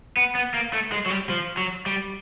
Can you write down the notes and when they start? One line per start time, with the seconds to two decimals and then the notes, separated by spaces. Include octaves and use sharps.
0.17 B3
0.35 B3
0.54 A#3
0.73 A3
0.92 G#3
1.06 F#3
1.10 G3
1.29 F3
1.57 F#3
1.86 G3